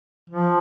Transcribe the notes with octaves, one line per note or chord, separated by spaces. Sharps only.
F3